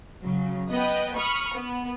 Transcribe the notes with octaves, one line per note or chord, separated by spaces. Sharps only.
C#3 F#3
B3 B4 D#5 G5
B5 C#6 D#6 F6
B3